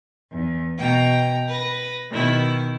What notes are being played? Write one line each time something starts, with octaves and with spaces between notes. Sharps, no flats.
E2
B2 G5 A#5
B4 A#6
B2 D#3 E4